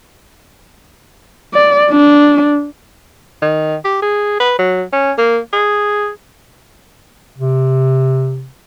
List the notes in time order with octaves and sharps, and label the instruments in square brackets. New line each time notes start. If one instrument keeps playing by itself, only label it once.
[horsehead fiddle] D5
D4
[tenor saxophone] D#3
G4
G#4
B4
F#3
C#4
A#3
G#4
[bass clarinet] C3